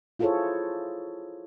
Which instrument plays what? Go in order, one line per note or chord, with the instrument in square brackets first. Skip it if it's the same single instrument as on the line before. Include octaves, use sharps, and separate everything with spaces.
[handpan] E4 F4 G#4 A4 C5 C#5